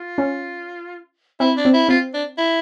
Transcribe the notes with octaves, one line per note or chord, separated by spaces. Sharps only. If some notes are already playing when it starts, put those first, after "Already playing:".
Already playing: F4
C#4
C4 E4
D4
C4
E4
C4 F4
D4
E4